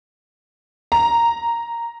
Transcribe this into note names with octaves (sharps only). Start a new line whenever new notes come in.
A#5